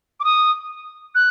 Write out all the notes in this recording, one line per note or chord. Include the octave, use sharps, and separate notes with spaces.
D6
D#6
F#6